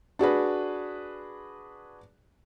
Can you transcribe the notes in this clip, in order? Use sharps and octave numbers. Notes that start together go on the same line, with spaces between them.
D4 F#4 G#4 B4